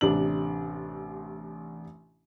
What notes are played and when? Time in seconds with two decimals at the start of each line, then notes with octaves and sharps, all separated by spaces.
0.01 A1 C3 D4 F#7